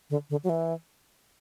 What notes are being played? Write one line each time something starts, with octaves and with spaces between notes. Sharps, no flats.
D3
D3
F#3
E3